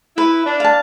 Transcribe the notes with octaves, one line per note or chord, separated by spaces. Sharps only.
E4 B4
D4
F5 A5